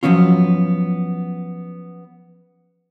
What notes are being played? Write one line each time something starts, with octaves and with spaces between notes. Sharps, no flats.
F3 F#3 B3 C#4 F4